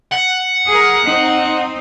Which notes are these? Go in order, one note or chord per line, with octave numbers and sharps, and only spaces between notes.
F#5
G#4 A#4
C4 D#4